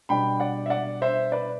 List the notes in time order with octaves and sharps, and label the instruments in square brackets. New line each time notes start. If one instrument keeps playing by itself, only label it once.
[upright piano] B2 G3 B3 D4 G5 B5
D5 F#5
E5
D5 F#5
C5 E5
B4 D5